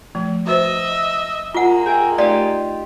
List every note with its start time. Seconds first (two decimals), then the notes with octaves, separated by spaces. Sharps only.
0.15 F3 A3
0.46 F#4 B4 C5 D#5 E5
1.54 G#3 A#3 F4 F#5
1.86 G#4 E5 G5
2.18 A3 D#4 F4 G4 D5